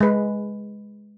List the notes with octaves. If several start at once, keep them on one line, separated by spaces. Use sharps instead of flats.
G#3 B4